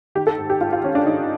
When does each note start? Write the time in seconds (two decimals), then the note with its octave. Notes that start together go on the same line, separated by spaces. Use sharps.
0.15 D#3 G4
0.27 A4
0.38 G#2
0.50 G4
0.61 G#2 F4
0.73 F4
0.83 D#3 C#4
0.95 D4
1.07 D#3 D#4